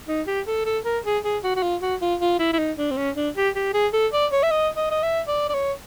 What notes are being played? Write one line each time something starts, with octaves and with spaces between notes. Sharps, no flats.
D#4
G4
A4
A4
A#4
G#4
G#4
F#4
F#4
F4
F#4
F4
F4
E4
E4
D#4
D4
C4
C#4
D4
G4
G4
G#4
A4
D5
C#5
E5
D#5
D#5
D#5
E5
D5
D5
C#5